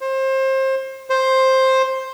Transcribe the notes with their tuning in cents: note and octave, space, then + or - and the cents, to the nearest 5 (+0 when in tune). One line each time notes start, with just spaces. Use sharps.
C5 +25
C5 +10